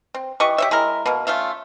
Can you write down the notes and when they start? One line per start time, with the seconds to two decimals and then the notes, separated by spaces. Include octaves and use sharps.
0.15 C4
0.40 E3 G4 D#5 C#6
0.58 G4 C#5 E5
0.71 G#3 E4 A#4
1.06 B2 A#3
1.27 A3 C#4 F4 E5